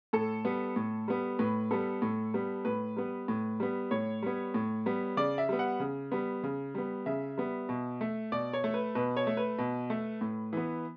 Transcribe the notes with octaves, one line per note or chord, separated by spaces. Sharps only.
A2 A4
G3 B3
A2
G3 B3
A2 B4
G3 B3 A4
A2
G3 B3
A2 B4
G3 B3
A2
G3 B3
A2 C#5
G3 B3
A2
G3 B3
C#3 D5
E5
G3 B3
F#5
C#3
G3 B3
C#3
G3 B3
C#3 E5
G3 B3
B2
A3
B2 D5
C#5
A3
B4
B2 B4
C#5
A3
B4
B2
A3
A2
E3 B3